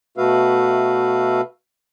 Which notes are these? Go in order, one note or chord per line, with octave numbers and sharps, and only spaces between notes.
B2 A3 F#4 B4 E5 F5